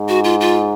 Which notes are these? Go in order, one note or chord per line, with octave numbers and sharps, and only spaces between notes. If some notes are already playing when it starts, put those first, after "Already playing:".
Already playing: G#2
F#4
F4
F4